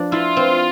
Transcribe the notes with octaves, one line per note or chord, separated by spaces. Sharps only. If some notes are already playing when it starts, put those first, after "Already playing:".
Already playing: F3 D4
E4 F4
C4